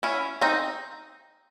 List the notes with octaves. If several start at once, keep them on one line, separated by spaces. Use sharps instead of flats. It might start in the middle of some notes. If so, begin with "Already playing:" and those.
C#4 E4
C4 D#4